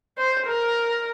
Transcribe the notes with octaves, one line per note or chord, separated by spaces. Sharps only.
C5
A#4